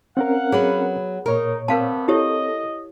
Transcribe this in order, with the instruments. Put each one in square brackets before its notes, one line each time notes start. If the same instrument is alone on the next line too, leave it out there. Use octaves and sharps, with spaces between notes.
[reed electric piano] C4 C#4 A#4 [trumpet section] F5 F#5
[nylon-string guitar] F#3 B3 B4 [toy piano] G#4
[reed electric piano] A#2 C#5 [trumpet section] D#4 [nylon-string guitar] A#4
[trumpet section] G3 A3 B3 [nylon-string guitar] C4 [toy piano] A#4 F5 A5
[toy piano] E4 G4 C#5 [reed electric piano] A4 [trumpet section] D#5